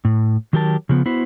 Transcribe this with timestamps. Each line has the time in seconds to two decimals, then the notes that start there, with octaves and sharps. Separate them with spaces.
0.05 A2
0.53 D#3 F#3 G4 A#4 A5
0.89 C#3 F3 B3
1.06 B3 E4 F#4 C5